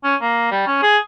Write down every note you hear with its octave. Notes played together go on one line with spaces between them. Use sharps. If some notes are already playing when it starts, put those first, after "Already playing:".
C#4
A#3
G3
C#4
G#4